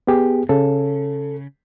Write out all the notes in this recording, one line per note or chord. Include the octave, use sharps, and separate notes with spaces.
B3 G4 G#4
C#3 A4